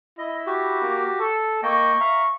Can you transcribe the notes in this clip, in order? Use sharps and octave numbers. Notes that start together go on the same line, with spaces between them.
E4 D#5
F#4 G4
A#3
A4
A#3 D#5 G5 C#6
E5 F5 A#5